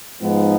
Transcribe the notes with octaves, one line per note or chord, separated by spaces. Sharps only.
G#2 F3 G#3 B3 D#4